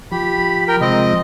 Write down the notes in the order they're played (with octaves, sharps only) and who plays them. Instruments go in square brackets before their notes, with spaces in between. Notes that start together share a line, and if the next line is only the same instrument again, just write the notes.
[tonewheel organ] F3 [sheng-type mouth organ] G4 B5
[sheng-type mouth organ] A#4 G5
[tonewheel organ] C3 F3 G#3 [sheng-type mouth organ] C4 D#5